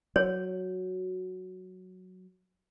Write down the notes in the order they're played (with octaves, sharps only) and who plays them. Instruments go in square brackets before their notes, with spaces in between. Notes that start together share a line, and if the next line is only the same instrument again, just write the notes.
[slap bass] F#3 [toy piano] C#5